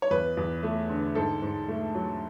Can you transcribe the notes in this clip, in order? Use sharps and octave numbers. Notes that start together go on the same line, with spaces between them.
C#5
E2 B4
E2
A3
D3
G#2 A4
G#2
A3
F#3